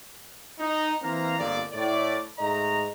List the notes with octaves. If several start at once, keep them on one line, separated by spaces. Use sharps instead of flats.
D#4
E3 A#3 C4 F5 A#5
G1 F2 A#3 D5
A2 D5
G#2 A3 D#5 A#5